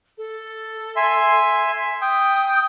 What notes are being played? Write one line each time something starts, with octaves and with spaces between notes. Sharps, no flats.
A4
E5 G#5 C6
G5 D#6